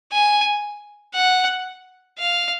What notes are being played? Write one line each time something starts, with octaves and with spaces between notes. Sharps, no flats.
G#5
F#5
F5